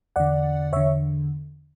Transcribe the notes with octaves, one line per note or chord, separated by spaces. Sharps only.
E2 D3 D5 F#5
E2 D3 C#5 E5